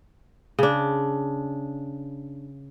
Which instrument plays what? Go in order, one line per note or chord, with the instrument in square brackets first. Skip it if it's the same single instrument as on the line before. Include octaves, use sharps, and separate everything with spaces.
[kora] C#3 D4